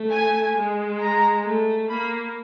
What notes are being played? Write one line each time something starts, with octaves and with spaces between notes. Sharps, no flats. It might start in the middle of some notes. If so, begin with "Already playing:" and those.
Already playing: A3
G#5
G#3
A#5
A3
A#3 B5